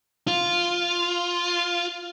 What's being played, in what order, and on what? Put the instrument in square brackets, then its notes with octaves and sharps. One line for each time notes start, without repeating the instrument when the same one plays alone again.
[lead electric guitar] F4